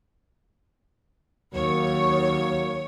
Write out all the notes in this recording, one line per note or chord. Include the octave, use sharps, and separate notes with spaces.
D#2 D#3 F#3 A#3 C#5